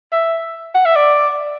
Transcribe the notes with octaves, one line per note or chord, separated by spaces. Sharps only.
E5
F#5
E5
D5